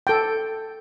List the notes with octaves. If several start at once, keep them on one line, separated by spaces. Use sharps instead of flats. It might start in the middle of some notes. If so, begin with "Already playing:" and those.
A4 G5